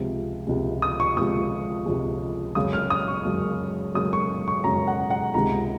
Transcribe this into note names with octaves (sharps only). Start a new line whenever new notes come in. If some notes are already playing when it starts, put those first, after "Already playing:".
Already playing: C#2 C3 F3 G#3
C#2 C3 F3 G#3
D#6
C#6
C#2 C3 F3 G#3 D#6
C#2 C3 F3 G#3
F#2 C#3 G#3 D#6
F6
D#6
C#6
F#2 C#3 G#3
F#2 C#3 G#3 D#6
C#6
C#6
F#2 C#3 G#3 A#5
F#5
F#5
C#2 C3 D#3 G#3 A#5